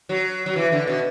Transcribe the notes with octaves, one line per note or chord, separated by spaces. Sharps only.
F#3
F#3
E3
D3
B2